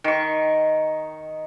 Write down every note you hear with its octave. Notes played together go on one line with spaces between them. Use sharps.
D#3 C#6